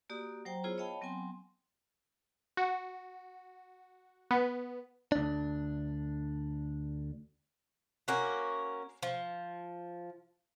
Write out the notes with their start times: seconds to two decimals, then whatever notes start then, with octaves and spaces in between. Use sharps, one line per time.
0.09 A#3 F#4 G4 D5 D#6
0.45 F#3 C5 G5 A#5
0.64 B3 E4 F4 G#4 C5 C#5
0.78 C#5 D#5 F5 G5 A5 B5
1.01 F#3 B3 C4 G5 G#5 C6
2.57 F#4
4.31 B3
5.12 D2 D4
8.08 A#3 C#4 F#4
9.03 F3